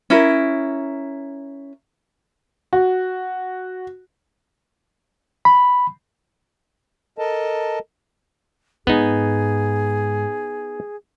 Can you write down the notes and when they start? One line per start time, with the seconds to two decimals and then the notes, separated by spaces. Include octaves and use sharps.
0.10 C#4 E4 A#4
2.73 F#4
5.45 B5
7.18 A4 A#4 D#5 A5
8.87 G#2 B3 D#4 G#4